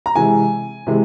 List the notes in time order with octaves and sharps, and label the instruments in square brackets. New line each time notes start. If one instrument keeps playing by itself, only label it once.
[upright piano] A#5
C3 E3 G#3 G#5
C3 E3 G#3